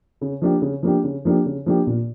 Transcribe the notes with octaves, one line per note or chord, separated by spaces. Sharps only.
C#3
F3 A#3 D4 G4
C#3
F3 A#3 D4 G4
C#3
F3 A#3 D4 G4
C#3
F3 A#3 D4 G4
A#2